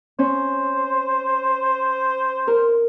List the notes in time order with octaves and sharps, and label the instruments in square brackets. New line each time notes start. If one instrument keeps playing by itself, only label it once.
[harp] C#4 [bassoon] C5
[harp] A#4